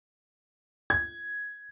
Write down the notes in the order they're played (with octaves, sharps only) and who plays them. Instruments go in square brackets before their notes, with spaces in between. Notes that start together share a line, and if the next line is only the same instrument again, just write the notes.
[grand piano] G#6